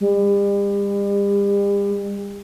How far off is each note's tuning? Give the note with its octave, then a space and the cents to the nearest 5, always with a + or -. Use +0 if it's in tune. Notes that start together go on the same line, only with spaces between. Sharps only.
G3 +40